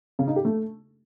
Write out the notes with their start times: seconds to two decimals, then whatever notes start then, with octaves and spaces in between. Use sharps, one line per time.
0.19 C#3
0.27 D#4
0.36 G4
0.45 A3